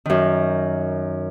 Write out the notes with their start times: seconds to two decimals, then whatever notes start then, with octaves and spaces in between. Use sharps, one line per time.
0.06 F#2 D#3